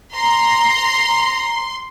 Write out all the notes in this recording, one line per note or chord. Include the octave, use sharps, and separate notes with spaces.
A#5 C6